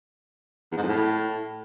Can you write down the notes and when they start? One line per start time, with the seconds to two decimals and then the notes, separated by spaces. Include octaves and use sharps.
0.72 E2
0.77 G#2
0.83 F2
0.88 A2